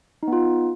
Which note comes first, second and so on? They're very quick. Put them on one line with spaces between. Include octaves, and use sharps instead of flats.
D#4 B3 F4